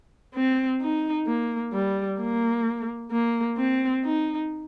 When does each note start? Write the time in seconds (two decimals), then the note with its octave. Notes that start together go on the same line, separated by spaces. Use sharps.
0.35 C4
0.81 D#4
1.27 A#3
1.73 G3
2.20 A#3
3.11 A#3
3.57 C4
4.05 D#4